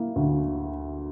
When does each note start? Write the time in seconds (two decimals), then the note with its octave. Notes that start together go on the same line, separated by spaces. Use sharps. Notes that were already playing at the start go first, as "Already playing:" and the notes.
Already playing: A#3 E4
0.16 D2